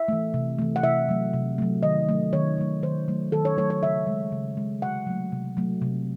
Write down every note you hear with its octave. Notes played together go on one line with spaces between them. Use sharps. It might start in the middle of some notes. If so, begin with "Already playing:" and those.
Already playing: E5
E3 A3
C3
E3 A3
F#5
C3 E5
F#3 A3
C3
F#3 A3
D#3 D#5
F#3 A3
D#3 C#5
F#3 A3
D#3 C5
F#3 A3
D#3 A4
C#5
F#3 A3 C#5
C#5
C#3 E5
G#3
C#3
G#3
C3 F#5
F#3 A3
C3
F#3 A3
C3